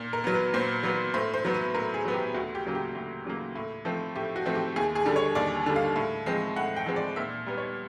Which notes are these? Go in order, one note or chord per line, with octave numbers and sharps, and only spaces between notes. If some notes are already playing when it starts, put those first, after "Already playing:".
Already playing: A#2
A#4
F#3 B3
B4
A#2 C5
F#3 B3
A2 C5
C5
F#3 B3
B4
A2 A#4
G#4
F#3 B3
G4
D2 F#4
G4
C#3 F#3 A#3
G4
D2
C#3 F#3 A#3
A2
F3 A3 C4
A2 G4
F#4
F3 A3 C4
G4
D#2 G#4
G#4
D3 G3
C#5
D#2 D5
D3 G3
F5
A2
F3 G#3 C4
A2 F#5
G5
F3 G#3 C4
D5
A#2 E5
G3 B3
C#5